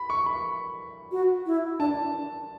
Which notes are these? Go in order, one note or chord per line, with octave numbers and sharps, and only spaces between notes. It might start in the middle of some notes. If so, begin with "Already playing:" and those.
Already playing: B5
C#6
B5
F#4
E4
D4 A5